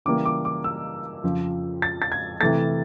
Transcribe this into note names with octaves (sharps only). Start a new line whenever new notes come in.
C#3 E3 G3 A#3 D6
D6
D6
E6
F2 C#3 F3
A6
A6
G#6
C3 E3 A3 A6